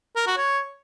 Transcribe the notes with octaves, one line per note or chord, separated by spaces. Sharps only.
A#4
F#4
C#5